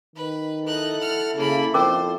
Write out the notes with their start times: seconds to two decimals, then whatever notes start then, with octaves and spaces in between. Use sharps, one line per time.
0.16 D#3 B4
0.66 D#4 E4 A4 F#6
0.99 F#5 F6
1.37 C#3 A#3 B5
1.74 F2 C#4 A#4 C5 D6